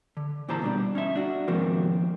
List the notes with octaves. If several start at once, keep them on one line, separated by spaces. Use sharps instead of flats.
D3
A#2 E3 G4 C5 A5 A#5
B2 G3 D4
C#4 D#4 E5
D4 F#4
G#2 C3 D#3 F3 A#3 C4